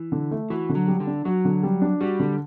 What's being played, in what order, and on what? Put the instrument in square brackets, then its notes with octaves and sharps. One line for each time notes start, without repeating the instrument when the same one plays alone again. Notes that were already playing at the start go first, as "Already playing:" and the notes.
Already playing: [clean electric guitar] E3
[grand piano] D3
A3
[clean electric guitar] E3 [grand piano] F#4
[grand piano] D3
[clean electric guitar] F#3
[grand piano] G3
[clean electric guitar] D3
[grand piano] D4
[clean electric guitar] F#3 [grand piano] F#4
[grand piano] D3
G3
D4
[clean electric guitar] G3 [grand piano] F#4
[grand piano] D3